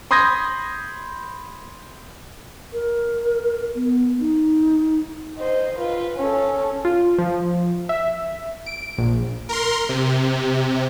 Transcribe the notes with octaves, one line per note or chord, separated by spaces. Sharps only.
B5 C6 D#6 G6 G#6 A#6
A#4
B3
D#4
C5 D#5
F4 B4
C#4 A4
F4
F3
E5
D7
A#1
A#4 C6
C3